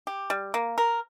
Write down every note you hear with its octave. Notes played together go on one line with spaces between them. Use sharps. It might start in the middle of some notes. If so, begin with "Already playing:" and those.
G4
G3
A#3
A#4